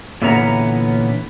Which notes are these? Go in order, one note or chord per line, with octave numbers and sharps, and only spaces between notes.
A#2 D3 E3 B3 C#4 A#5